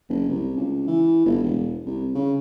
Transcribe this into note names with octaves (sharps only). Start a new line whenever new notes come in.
F#1
C2
C#2
E3
G1
E1
C2
C#3